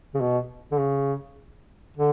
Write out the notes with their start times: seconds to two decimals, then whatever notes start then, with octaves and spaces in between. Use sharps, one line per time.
0.14 C#3
0.20 B2
0.71 D3
0.79 C#3
1.97 D3